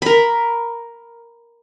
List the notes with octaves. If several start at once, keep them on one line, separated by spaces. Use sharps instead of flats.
A#4 B5